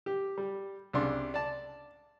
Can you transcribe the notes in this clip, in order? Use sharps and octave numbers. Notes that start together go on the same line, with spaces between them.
G4
G3
C2 C#3 D4 C6
D5 A5